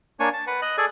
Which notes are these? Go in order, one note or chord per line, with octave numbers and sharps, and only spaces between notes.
A#3 D4 C#5 G#5
A5
B4 F#5
D#5 F#6
G#4 A4 D5 G#5